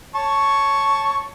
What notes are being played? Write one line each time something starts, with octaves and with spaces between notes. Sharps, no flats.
C#5 A5 C#6